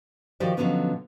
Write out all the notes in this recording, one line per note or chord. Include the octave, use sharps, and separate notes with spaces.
D#3 F3 F#4 G4 C5 D5
B2 D3 F3 F#3 B3 C#4